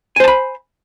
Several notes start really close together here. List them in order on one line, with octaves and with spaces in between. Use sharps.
G#5 C5 A5 B5